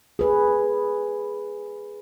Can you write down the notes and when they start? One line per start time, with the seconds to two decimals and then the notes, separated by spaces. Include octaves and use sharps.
0.19 G#4 B4